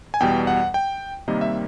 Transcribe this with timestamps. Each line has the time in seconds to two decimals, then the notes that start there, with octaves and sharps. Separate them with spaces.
0.14 G#5
0.20 E2 B2 G3 G5
0.47 F#5
0.74 G5
1.28 C3 D#3 G3 A#3 D#5
1.41 E5